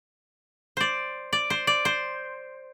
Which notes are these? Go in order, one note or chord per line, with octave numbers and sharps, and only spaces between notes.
C5 D5
D5
C5
D5
C5